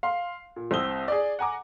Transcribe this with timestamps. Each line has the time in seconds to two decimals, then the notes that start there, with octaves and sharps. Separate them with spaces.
0.03 F5 C6
0.56 A#2
0.71 C2 C4 D#6 E6 G7
1.08 G#4 D5
1.39 F#5 G#5 A#5 D6